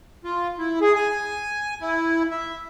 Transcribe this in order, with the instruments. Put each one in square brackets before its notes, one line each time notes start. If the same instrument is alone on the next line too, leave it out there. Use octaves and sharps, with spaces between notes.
[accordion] F4
E4
G#4
G#5
E4
E5